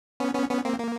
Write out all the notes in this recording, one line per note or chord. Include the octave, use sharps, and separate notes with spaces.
B3 C#4
B3 C#4
B3 C#4
A#3 C4
A#3